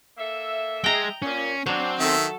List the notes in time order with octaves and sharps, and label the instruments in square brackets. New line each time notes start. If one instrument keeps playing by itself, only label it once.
[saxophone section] A#3 A4 E5
[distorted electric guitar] G#3 [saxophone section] D#5 E5 [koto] G5 A#5
[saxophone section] A#2 [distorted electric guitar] C#4
[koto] F#3 [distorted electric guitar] C4 C5 [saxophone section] D4
[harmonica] D#3 E5 [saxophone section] A4